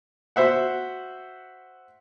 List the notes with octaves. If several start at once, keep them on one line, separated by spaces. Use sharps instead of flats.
F#4 C5 E5 F#5